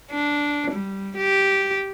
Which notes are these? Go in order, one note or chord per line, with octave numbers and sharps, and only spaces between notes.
D4
G3
G4